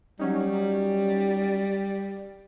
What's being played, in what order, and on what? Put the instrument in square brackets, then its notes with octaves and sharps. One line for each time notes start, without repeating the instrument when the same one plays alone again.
[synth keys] F#3 C#4 D#4 [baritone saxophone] G3